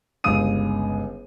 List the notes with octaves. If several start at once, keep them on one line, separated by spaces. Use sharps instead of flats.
G1 C#2 F5 D#6 D#7